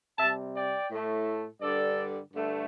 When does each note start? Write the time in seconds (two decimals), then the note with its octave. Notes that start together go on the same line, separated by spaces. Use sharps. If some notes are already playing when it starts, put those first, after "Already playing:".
0.19 C3 G3 E5 A5
0.54 D5 G5
0.90 A2 A3
1.61 G2 D3 G3 A4 D5
2.33 G2 D3 A3